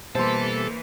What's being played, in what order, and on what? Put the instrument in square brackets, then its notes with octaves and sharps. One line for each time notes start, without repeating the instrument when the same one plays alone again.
[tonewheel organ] B2 G3 [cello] E3 A#3 [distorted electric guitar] A4 [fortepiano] C5 C6